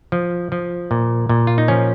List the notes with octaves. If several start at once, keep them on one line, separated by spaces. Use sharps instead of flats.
F3
F3
A#2
A#2
F4
D#4
F3 C#4